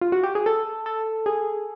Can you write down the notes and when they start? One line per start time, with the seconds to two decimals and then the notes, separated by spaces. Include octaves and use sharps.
0.01 F4
0.12 F#4
0.24 G4
0.35 G#4
0.46 A4
0.86 A4
1.26 G#4